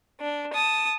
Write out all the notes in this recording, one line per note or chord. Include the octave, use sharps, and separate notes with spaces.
D4
A5 D#6